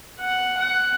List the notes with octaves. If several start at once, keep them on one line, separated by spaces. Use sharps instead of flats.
F#5
F#5